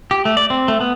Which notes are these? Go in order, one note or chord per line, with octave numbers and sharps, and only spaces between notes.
G4
A3
D5
C4
A3
B3